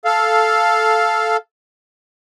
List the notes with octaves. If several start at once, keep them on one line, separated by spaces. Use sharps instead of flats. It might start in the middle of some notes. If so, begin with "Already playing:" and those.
A4 F5